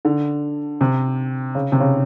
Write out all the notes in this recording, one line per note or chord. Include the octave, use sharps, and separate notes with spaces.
D3
C3
C#3
C3
C#3